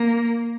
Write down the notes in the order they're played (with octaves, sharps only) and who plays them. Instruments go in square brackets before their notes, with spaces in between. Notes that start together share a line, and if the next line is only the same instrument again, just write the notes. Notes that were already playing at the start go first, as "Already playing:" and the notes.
Already playing: [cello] A#3